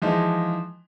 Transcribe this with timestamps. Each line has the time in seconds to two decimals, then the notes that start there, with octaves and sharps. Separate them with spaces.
0.02 E3 F3 G#3 D#4